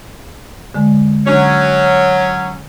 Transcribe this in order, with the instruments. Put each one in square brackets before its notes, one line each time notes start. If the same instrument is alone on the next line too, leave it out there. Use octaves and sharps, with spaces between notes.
[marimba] D3 G#3
[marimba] D3 D4 [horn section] F#3 C#4